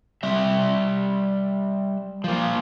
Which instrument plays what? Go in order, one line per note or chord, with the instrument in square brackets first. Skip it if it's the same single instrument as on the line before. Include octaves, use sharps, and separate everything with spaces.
[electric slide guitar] G3 E5
F3 A#3